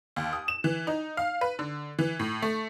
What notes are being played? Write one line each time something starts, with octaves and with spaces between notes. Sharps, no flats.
D#2
D#6
E7
E3
D#4
F5
B4
D3
E3
A2
A3